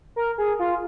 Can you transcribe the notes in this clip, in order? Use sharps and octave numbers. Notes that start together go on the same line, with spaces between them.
A#4
G#4
F4